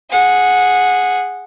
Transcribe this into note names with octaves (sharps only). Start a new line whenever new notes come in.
G#4 F#5